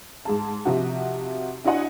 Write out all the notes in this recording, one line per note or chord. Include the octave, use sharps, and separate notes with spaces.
G#2 G#4 A5
C3 F3 D#4 F#4
D4 E4 F#4 D#5 F#5 G#5